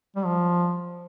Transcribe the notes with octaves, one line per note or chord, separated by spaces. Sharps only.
G3
F3